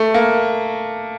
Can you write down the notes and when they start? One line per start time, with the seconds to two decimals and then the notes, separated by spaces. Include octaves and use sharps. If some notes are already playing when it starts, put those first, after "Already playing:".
Already playing: A3
0.14 A#3